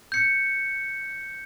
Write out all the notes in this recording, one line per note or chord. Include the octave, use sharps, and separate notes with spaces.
G6 C#7